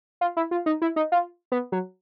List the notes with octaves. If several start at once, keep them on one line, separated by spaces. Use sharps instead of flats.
F4
E4
F4
D#4
E4
D#4
F4
B3
F#3